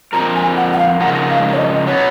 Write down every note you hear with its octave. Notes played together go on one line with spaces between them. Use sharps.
F2 F3 A#4 A#5
G#5
F#5
F#5
F5
C#3 F3 D#4 A#4 F#5
F5
C#5
D#5
F#3 B3 C#5